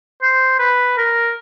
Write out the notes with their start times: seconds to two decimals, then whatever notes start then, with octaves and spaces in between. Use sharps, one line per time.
0.22 C5
0.59 B4
0.97 A#4